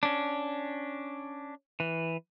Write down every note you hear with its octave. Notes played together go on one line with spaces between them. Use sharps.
C#4 D4
E3